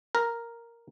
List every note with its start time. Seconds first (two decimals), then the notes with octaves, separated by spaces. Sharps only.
0.15 A#4